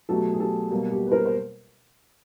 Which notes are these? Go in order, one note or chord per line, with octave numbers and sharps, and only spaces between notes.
B2 F#3 A3 G4 A4
G#4
G4 A4
B2 G3 A#3
G4
B4
A#4 C5
C5